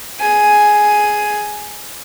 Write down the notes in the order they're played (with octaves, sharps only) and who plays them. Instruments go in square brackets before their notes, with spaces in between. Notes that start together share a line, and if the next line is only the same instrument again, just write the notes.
[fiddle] G#4 G#5